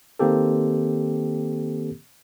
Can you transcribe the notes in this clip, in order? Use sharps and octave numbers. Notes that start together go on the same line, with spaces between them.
D#3 A#3 C4 G4 A4